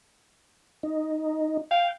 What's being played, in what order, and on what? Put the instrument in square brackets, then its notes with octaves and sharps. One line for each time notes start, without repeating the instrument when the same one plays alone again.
[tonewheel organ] D#4
[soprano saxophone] F5 [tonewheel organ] G5